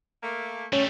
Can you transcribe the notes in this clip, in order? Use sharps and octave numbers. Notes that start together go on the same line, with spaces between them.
A3 A#3
G3 A3 C#4 C#5